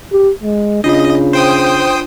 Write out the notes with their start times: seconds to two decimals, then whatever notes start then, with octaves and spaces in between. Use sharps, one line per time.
0.13 G4
0.43 G#3
0.84 C#3 D4 F4 D#5
1.33 C5 G5 D#6